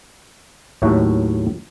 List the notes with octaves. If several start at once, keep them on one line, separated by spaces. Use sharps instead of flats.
D#2 A2 F#3 F#4 A4 E5